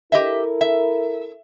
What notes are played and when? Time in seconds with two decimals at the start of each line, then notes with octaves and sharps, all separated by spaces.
0.12 E4 G4 A4 A#4 D#5 E5
0.61 E5